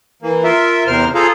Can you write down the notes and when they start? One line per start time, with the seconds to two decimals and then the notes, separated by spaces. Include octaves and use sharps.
0.22 E3 A#3
0.44 F4 A#4 E5
0.87 E2 C3 A#4 C5 F6
1.15 F4 G#4 A4 C5 F5 A#5